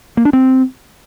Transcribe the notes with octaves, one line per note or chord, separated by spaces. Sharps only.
A#3
D4
C4